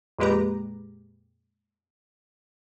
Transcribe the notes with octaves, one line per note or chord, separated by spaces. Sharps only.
F2 A#2 G#3 G4 B4 A#5